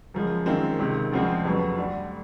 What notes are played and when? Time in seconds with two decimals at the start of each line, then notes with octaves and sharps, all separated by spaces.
0.14 F#2 C#3 F3 G#3
0.46 F#2 D#3 G#3 C4 F4
0.79 C#2 C3 D#3
1.12 D2 C#3 F3 G#3 C4
1.45 F2 C#3 F#3 B3
1.78 D2 D3 G3